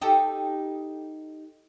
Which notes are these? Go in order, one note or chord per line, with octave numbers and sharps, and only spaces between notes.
D#4 G4 A4